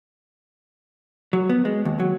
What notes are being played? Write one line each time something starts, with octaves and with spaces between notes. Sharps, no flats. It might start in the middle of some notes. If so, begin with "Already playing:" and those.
F#3
B3
G#3
D#2
F#3